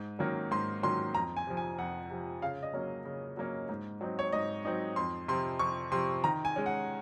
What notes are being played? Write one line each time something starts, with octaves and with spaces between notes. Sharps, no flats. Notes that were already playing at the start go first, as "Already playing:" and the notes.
Already playing: G#2
D#3 F#3 A#3 C#4
G#2 C6
D#3 F#3 A#3 C#4 C6
F2 A#5
G#5
C3 F3
G#5
F2 F#5
C3 F3
C#3 F5
D#5
F#3 A#3 C#4
C#3
F#3 A#3 C#4
G#2
F#3 C4 D#4
C#5
G#2 D#5
F#3 C4 D#4
F2 C6
C3 F3 C6
F2 C#6
C3 F3 C6
D#3 A#5
G#5
G#3 C#4
F#5